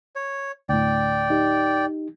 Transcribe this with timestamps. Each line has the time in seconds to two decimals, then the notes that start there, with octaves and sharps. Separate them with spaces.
0.16 C#5
0.69 D2 A2 D5 G5
1.30 D#4 G4